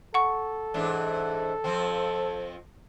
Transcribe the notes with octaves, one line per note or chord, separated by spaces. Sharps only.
A4 F#5 C#6
G#2 E3 D4
F2 F3 C4